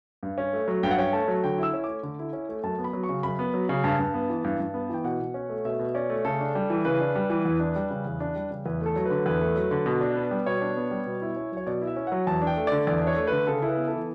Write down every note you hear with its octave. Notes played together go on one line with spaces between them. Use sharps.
G2
C#4
A3
F#3
G2 G5
F#5
C#4 G5
A3 A5
F#3
D3 G5
E4 E6
C#4
A3 D6
D3
E4
C#4
A3
F#2 A5
B3
B5
F#3
C#6
C#3
F#2 B5
B3
F#3
C#3
G2 A5
G2
B3
E3
G2
G2
B3
E3 G5
B2 F#5
B2
C#4
A3
B2 E5
B2
C#4 D5
A3
C#3 A4
D4
G3
E3
C#3 B4
D4
G3
E3
E2
D4
G3
C#3
E2
D4
G3
C#3
E2 B4
A3 A4
F#3
D3 B4
E2 B4
A3
F#3
D3
B2
D4
B3
G3
B2 C#5
D4
B3
G3
B2
E4
C#4
F#3 C#5
B2 D5
E4
E5
C#4
F#3 F#5
E2 A5
D4
G5
A3
D3 D5
E2 D5
D4
C#5
A3
D3 B4
C#3 A4
E4
B4
B3
E3 A4